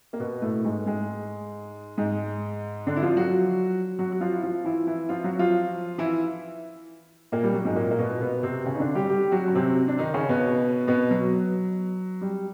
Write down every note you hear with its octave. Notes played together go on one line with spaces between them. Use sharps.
A#3
B2 B3
A2 A3
G#2 G#3
G#2 G#3
G#2 G#3
D3 D4
E4
F3 F4
F#3 F#4
F#3 F#4
F#4
F3 F4
E4
F3 F4
E3 E4
E3 E4
F3 F4
F#3 F#4
F3 F4
E3 E4
A#2 A#3
G3
F#3
G#2 G#3
A#2 A#3
A#3
B2 B3
B2 B3
B3
C3 C4
C#3 C#4
D#4
D3 D4
G3 G4
G3 G4
F#3 F#4
C#4
C3 C4
D4
D#3 D#4
C#3 C#4
B2 B3
B2 B3
F#3
G3